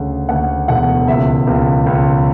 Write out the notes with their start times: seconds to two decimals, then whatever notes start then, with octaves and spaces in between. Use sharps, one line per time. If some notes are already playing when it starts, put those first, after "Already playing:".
Already playing: D2 C#3 F#5
0.29 D2 F#5
0.68 E1 F#5
1.07 C#2 E5
1.47 C#2
1.86 C#2